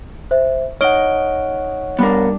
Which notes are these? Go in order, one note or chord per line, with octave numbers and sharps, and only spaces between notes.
C5 E5
D#4 C#5 D#5 F#5 F6 D7 G7
G3 B3 D4 A#4